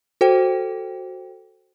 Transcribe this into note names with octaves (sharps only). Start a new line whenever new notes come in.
F#4 A4 C5 G5